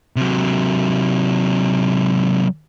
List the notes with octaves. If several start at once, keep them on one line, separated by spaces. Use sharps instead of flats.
C3 F#3